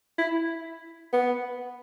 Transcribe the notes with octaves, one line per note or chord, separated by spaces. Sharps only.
E4
B3